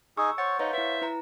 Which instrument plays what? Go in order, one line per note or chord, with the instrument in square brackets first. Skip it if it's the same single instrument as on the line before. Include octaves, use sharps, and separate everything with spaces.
[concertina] D#4 G#4 [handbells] C#6 [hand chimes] E6
[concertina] C5 [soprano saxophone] C#5 [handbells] F#5 C#6 A6
[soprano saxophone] D#4 [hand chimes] B4 C#5 F5
[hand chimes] E4 B4 [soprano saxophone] E5
[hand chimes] E4 B4 A#5